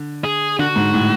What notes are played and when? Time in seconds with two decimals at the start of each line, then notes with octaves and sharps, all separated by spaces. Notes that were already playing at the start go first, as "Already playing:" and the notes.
Already playing: D3
0.24 G#4
0.59 D3 F#4
0.76 G#2
0.94 A2